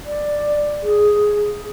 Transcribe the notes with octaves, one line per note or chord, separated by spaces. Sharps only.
D5
G#4